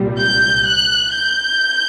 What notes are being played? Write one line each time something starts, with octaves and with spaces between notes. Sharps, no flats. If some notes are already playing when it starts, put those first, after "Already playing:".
Already playing: C2 A#2 G3
G6
F#6
G6